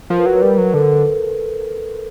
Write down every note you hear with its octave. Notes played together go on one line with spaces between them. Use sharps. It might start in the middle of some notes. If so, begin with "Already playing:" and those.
F3 A#4
B4
F#3 A#4
B4
G3 A#4
B4
F#3 A#4
D3 A4